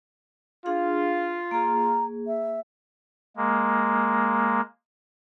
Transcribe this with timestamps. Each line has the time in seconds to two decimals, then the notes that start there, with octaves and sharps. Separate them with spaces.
0.66 D4 F4 G#4 F5
1.51 A#3 G#4 A#5
2.26 E5
3.37 G#3 A#3